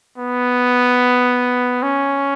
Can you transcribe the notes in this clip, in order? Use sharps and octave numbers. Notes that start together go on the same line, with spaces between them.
B3
C#4